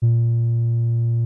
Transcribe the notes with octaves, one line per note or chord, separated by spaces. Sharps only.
A#2